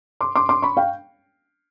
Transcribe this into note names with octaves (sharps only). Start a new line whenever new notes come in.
C6 D6
C6 D6
C6 D6
B5 C#6
F5 G5